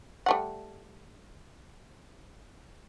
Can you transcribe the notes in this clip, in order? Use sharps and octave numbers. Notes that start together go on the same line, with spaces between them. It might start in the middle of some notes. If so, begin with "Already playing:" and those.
G3 A3 F#5